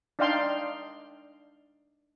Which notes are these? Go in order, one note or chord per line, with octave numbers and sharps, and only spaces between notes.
D4 D#4 D5 F5 G5 C6